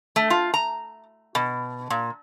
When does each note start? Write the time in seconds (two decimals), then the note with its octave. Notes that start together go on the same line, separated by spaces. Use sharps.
0.16 A3
0.30 F4
0.54 A#5
1.35 B2
1.90 A#2